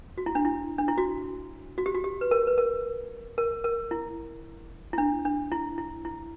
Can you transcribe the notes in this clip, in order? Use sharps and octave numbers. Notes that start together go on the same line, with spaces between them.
F#4
E4
D4
E4
D4
E4
F#4
F#4
G4
F#4
G4
B4
A#4
B4
A#4
A#4
A#4
E4
E4
D4
D4
E4
E4
E4